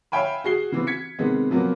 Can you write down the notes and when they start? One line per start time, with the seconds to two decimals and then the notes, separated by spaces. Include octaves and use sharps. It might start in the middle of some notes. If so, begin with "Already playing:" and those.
0.12 C#5 E5 F5 G5 G#5 B5
0.44 F#4 G#4 C7 G7
0.72 C#3 E3 B3 C4
0.87 G#6 B6 C#7
1.19 C3 D#3 G#3 B3 C4
1.50 C3 F3 F#3 A#3 B3